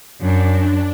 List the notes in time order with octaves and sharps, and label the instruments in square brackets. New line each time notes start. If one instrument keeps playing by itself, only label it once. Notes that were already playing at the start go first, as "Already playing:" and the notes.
[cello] F#2 [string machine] D4